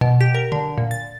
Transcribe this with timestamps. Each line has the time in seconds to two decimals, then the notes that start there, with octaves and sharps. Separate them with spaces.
0.01 B2
0.21 G4
0.35 A#4
0.52 D3
0.78 A#2
0.91 A6